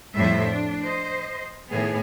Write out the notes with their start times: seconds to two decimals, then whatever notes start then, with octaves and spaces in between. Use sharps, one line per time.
0.16 F2 A2 G3 C5 E5
0.48 D4
0.83 C5 D#5
1.69 A2 D#3 B3 G#4